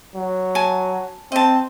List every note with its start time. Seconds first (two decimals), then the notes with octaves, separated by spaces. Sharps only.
0.15 F#3
0.55 G#5 A5
1.32 C4 D#5 A5